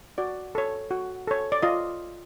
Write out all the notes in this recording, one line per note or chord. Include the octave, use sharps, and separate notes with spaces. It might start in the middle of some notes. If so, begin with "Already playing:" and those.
F#4 D5
A4 C#5
F#4
A4 C#5
D5
F4 D#5